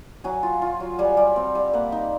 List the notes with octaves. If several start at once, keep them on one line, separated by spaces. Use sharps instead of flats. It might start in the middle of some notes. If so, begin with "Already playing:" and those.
F#3 F#5 G#5
F4
F4
F#3
G3 F#5 G#5
G3
C4
G3
A#3 E5 F#5
D#4